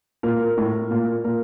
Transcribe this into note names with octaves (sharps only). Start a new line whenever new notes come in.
A#2 A#4
A2
A#2
A#2 A#4